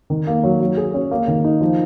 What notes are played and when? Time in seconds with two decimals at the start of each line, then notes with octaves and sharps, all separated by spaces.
0.10 D#3
0.27 A#3
0.44 F#3
0.61 F#3
0.77 G#4
0.94 C#4
1.11 A#3
1.28 D#3
1.44 D#4
1.61 F3